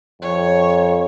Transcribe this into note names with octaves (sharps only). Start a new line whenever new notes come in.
F2 C#5